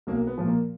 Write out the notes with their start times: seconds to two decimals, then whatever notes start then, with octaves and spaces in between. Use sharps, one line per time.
0.07 B1 A#3
0.27 B3
0.38 A#2 F3
0.47 A#3